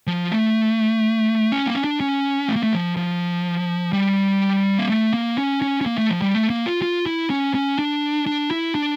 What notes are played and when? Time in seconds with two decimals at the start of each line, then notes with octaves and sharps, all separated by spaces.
0.07 F3
0.32 A3
1.52 C#4
1.66 A#3
1.75 C#4
1.84 D4
2.00 C#4
2.48 A3
2.56 A#3
2.63 A3
2.73 F3
2.97 F3
3.93 G3
4.78 A#3
4.89 A3
5.14 A#3
5.38 C#4
5.62 C#4
5.81 C#4
5.86 A#3
5.98 A3
6.10 F3
6.22 G3
6.34 A3
6.50 A#3
6.66 F4
6.82 F4
7.06 E4
7.30 C#4
7.55 C#4
7.79 D4
8.27 D4
8.51 E4
8.75 D4